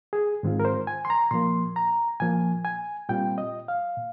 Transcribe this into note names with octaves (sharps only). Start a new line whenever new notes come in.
G#4
G#2 D#3 G#3 C4 F4
A#4
C5
G#5
C6
A#5
A#2 F3 A#3 C6
A#5
A#2 F3 A#3 G#5
G#5
A#2 G3 C4 F4 G5
D#5
F5
A#2